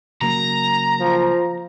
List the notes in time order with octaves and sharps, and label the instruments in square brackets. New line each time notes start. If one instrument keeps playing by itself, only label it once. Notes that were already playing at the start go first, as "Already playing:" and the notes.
[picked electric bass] C#3 F#3 A#3 [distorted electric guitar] A#5
[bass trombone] F3